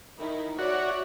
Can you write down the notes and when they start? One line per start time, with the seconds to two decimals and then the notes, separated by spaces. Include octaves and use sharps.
0.19 D#3 D#4 E4
0.59 F#4 C#5 D5 E5 F#5